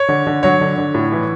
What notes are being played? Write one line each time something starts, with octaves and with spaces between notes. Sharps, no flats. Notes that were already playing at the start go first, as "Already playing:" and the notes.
Already playing: C#5
D3
D3
F#3 C#5
D3
D3
A2
E3